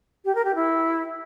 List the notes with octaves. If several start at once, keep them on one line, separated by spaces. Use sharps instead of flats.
G4
A#4
G4
E4